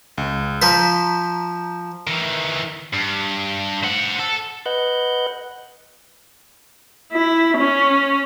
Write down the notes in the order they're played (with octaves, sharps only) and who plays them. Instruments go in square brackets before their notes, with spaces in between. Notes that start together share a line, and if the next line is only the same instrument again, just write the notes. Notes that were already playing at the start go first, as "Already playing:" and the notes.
[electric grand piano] C#2
[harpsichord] F3 C5 [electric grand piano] A#5 B6
[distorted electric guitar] D#3 E3
G2
C5 F#5
A4
[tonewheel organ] B4 D#5 F#5 F#6 G6
[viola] E4
C#4